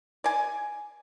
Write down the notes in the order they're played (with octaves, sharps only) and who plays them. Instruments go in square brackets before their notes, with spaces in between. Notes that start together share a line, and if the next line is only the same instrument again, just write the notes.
[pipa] D5 G#5